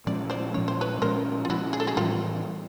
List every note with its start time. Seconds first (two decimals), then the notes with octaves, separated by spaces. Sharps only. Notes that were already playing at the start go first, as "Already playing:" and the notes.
0.07 A#2 F3 G#3 C#4 D5
0.30 C5 D5
0.54 A#2 F3 G#3 C#4 C#5
0.68 C5
0.81 B4 C#5
1.02 A#2 F3 G#3 C#4 A#4 C5
1.45 F4
1.49 A#2 F3 G#3 C#4 E4 F#4
1.73 G#4
1.80 A4
1.87 F#4 G#4
1.97 A2 E3 G3 F4 G4